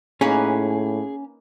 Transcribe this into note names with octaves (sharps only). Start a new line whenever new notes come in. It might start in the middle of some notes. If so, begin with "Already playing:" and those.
A2 A#3 C#4 D#4 G#4 B4